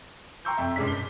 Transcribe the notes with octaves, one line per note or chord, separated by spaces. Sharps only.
G5 A#5 C6 C#6 E6 G6
F2 E5
G2 A#2 G#3 C#4 B6
G7